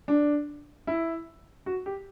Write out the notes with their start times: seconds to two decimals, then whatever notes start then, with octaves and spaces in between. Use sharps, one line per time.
0.08 D4
0.87 E4
1.66 F#4
1.86 G4